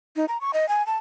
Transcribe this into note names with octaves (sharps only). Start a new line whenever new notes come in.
D#4
A#5
C#6
D#5
G#5
A5